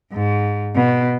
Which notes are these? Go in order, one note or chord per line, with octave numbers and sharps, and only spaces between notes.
G#2
B2